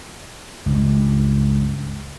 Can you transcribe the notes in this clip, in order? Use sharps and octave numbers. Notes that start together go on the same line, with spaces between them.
C#2 G2